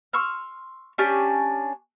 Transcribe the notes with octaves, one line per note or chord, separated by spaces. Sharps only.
C6 C#6 E6 F6
C#4 D4 G4 G#5